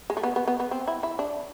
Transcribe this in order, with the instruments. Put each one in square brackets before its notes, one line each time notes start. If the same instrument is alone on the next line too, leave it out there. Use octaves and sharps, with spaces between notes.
[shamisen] G#3
A3
B3
B3
B3
B3
C4
E4
E4
D4